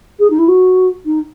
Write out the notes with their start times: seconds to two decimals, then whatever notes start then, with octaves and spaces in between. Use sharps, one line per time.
0.19 G#4
0.30 D#4
0.38 E4
0.48 F#4
1.05 D#4